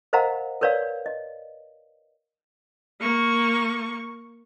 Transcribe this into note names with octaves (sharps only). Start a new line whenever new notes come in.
A#4 C5 D#5 F5 F#5 A#5
A#4 B4 C#5 D5 F5
D#5
A#3 C#6